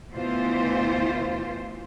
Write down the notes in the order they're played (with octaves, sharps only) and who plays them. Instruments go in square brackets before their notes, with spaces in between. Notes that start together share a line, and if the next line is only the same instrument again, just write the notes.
[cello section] D2 B2 E3 F4 C5